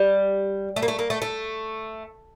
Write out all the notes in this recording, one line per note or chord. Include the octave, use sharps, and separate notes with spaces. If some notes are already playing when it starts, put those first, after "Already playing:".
Already playing: G3
A3
A#3
A3
A#3
A3
A3